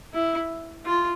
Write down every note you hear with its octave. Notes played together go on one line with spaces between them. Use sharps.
E4
F4